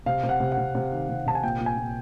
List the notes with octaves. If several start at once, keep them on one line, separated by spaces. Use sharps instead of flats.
C3 F5
C3
F#5
C3
F#5
C3
C3
D#3
C3
C3 A5
G#5
A#2 G5
A#2
G#5
A#2